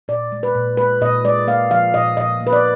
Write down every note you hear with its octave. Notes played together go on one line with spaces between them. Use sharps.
A#2 D5
G#3
B4
A#2
G#3 B4
A#2 D#5
G#3 D5
A#3 F5
F3 F5
A#2 D#5
A#2 D#5
A#3
B4
D5